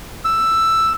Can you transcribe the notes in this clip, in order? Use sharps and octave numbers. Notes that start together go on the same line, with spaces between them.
E6